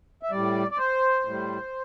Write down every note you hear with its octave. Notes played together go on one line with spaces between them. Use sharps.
E5
A2 G3 D5
D5
C5
A2 G3